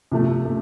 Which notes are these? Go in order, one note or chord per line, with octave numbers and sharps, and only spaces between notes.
C3 F3 A3
A3